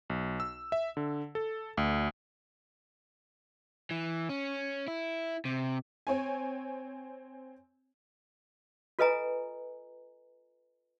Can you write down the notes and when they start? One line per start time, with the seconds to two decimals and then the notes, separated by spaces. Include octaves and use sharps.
0.10 B1
0.40 E6
0.72 E5
0.97 D3
1.35 A4
1.77 D2
3.91 E3
4.29 C#4
4.88 E4
5.45 C3
6.07 C4 C#5 G#5
8.99 F4 A4 B4 D#5 G#5 A#5